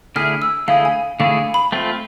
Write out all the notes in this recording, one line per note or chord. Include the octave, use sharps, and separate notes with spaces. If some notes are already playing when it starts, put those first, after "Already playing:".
D3 A3 E4 G#4 F6
E6
D3 A3 E4 G#4 F5
G#5
D3 A3 E4 G#4 F5
B5
A3 C4 F4